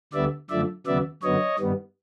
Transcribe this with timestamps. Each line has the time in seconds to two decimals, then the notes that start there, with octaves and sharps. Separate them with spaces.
0.13 D2 D3 G3 B3 D5 E5
0.50 F#2 D3 F3 A3 D5 E5
0.86 D#2 C#3 F#3 B3 D5 E5
1.23 F#2 D3 F#3 B3 C#5 D#5
1.59 G2 D#3 G3 B3